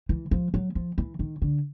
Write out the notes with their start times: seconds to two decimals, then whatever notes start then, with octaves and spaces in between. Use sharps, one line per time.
0.09 E3
0.31 F3
0.54 F#3
0.75 F3
0.98 E3
1.19 D#3
1.42 D3